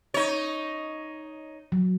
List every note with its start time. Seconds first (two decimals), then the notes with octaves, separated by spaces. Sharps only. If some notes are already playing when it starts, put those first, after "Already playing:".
0.14 D#4 C#5
1.72 F#3